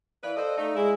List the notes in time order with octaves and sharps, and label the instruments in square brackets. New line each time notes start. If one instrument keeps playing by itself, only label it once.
[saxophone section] E3 B4 [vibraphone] D5 F5
[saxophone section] A4 C5 D#5
A3 D#4
[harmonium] G#3 G#4 [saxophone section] E4